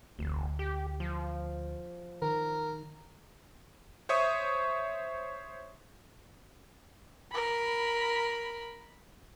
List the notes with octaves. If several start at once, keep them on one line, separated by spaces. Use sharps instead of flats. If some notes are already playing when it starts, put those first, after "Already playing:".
F1 D2
G4
F3
D#3 A#4
C5 C#5 E5 C#6 D#6
A#4 B5